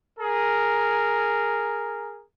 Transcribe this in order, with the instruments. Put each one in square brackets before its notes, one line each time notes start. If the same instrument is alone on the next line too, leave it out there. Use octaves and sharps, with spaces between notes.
[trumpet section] G#4 A#4